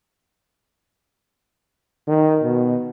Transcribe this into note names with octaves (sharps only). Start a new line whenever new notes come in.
D#3
B2